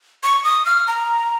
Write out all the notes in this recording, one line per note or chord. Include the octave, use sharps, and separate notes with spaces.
C#6
D#6
F6
A#5